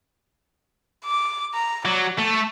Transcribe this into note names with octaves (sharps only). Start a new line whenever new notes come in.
D6
A#5
F#3 D5
A3 A5